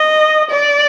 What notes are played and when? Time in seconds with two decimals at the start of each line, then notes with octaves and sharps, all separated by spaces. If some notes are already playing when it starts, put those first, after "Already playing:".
Already playing: D#5
0.50 D5